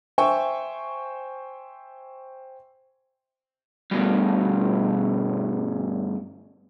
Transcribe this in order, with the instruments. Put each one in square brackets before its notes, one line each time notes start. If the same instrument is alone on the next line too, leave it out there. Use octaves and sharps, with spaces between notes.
[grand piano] C5 E5 G5 G#5 C#6
[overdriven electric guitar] G2 B2